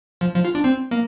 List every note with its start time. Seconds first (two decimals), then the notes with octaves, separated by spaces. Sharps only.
0.21 F3
0.35 F3
0.45 F4
0.55 D4
0.64 C4
0.91 A#3